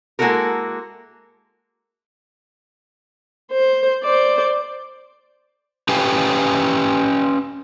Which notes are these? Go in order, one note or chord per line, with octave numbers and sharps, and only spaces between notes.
G#3 A#3 E4 F#4 A4 A#4
C5
C5 D5
C#4 G4 B4 F5 G5 G#5